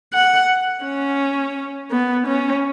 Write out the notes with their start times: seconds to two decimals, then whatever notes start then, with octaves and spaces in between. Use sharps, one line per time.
0.13 F#5
0.85 C#4
1.92 B3
2.27 C#4